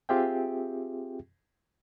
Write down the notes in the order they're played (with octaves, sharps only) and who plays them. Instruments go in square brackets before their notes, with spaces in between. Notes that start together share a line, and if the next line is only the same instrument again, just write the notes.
[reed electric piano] C4 F4 G4 G#4 E5 G5